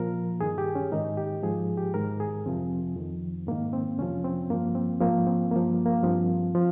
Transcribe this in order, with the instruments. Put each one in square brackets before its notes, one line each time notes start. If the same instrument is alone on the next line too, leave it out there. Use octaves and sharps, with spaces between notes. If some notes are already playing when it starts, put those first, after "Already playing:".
Already playing: [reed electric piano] A#2 F3 A#4
G2 D#3 G#4
G4
C#4
G#2 D#3 D#4
G4
G#2 F3 G#4
G4
G#2 D#3 A#4
G#4
F2 C3 F3 C4
F2 D#3
G#2 D#3 A#3
C4
F2 C3 F3 C#4
C4
G2 F3 A#3
C4
G#2 F3 A#3
C4
G2 F3 A#3
A#3
G2 F3 C4
F3